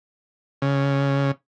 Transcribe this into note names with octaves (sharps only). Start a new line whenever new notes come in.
C#3